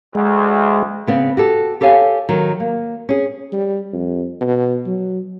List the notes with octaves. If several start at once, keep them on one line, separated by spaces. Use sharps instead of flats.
D2 G#3
C#3 B3 C4
F#4 G4 A4
G4 A4 C#5 F5 G#5
D#3 F#3
A#3
C#4 G#4
G3
F2
B2
F#3